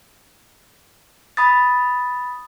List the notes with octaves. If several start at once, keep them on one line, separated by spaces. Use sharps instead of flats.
B5 D#6 A6